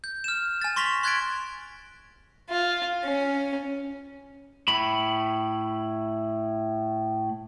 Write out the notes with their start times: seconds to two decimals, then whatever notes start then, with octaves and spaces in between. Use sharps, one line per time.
0.04 G6
0.24 F6 E7
0.61 G#5 A6
0.76 C6 C#6 A#6 B6 F7 G7
1.03 C6 F#6 G#6 A6 B6 D7
2.50 F4
3.04 C#4
4.68 A2 B5